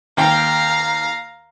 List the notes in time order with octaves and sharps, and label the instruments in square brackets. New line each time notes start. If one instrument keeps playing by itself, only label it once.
[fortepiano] D#2 G5 [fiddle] F5 A#5